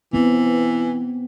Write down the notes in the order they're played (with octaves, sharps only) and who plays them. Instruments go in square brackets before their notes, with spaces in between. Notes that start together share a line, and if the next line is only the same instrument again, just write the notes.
[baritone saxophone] E3 [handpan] B3 C4